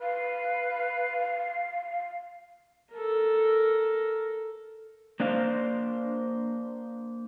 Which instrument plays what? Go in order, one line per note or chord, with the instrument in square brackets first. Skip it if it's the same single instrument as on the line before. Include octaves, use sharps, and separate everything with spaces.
[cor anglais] B4 [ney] F5
[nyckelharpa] A4 A#4
[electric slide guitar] A#3 D4 C5 F5